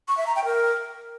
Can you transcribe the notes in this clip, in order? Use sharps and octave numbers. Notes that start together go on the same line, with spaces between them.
C#6
E5
A#5
G5
A#4